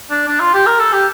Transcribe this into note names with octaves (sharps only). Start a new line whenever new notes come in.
D4
D4
F4
G4
A#4
A4
G4